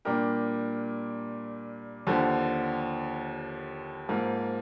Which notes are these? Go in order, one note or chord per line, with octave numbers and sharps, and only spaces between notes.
A#2 G3 D4 G4 A#4
D#2 D3 F3
G#2 F3 A#3